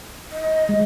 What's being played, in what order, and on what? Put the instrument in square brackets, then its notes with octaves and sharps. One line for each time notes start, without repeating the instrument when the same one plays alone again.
[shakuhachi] D#5
[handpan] G#3